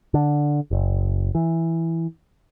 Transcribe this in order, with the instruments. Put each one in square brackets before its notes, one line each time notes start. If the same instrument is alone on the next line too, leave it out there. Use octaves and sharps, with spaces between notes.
[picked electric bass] D3
F#1
E3